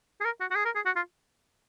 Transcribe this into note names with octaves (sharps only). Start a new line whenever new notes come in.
G#4
A#4
F#4
F#4
G#4
A#4
G#4
F#4
F4